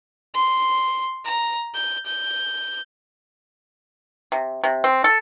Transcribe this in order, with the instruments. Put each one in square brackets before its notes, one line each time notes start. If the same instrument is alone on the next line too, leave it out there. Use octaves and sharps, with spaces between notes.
[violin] C6
A#5
G6
G6
[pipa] C3
C3
C4
A4